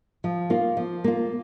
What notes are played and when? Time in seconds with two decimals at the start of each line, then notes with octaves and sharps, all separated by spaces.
0.24 F3
0.50 A#3 F4
0.77 F3
1.04 A#3 F4